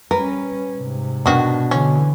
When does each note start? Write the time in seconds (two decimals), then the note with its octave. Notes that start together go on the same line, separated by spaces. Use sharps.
0.11 G3 C#4 A#4 B4
0.77 G#2 C3
1.26 B2 D#3 D4 F#4
1.71 D3 E3 C#4